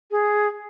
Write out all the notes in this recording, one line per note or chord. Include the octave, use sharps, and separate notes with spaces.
G#4